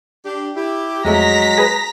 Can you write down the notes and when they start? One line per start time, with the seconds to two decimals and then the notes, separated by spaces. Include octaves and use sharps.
0.25 D4 G4
0.56 E4 G4
1.05 F2 F#3 G#3 A3 A#5 A#6 B6
1.58 G#4 B4